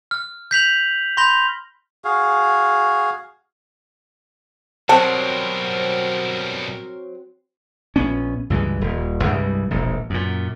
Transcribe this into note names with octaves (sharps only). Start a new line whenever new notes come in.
F6
G6 B6 F7 F#7
B5 C6 G6 A#6 F7
F#4 G#4 F5
B2 F#3 G3 C4 A#4 A5
A#1 B3 C#4
C#2 G2 E3 G#3
D#1
C2 G2 G3 G#3
E1 A#1
F#2 A#2